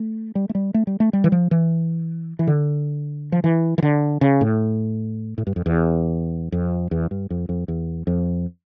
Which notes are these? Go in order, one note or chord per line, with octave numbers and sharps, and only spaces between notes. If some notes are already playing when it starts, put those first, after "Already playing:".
Already playing: A3
G3
A3
G3
A3
G3
A3
G3
E3
F3
E3
E3
D3
F3
E3
E3
D3
C#3
A2
A2
G2
F2
E2
F2
E2
G2
F2
F2
E2
F2